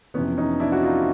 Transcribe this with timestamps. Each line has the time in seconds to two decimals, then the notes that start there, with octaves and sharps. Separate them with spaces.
0.14 F2 C3 E3 B3 C#4
0.37 C#4 D#4
0.60 D4 E4
0.72 F#4
0.83 D#4 F4